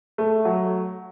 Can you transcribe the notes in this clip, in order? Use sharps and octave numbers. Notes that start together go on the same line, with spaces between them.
A3
F#3